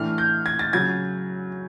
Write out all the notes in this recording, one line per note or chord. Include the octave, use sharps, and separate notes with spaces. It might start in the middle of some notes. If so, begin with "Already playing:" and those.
Already playing: A2 E3 A3 D4 F6
G6
G#6
A6
C#3 F#3 G#6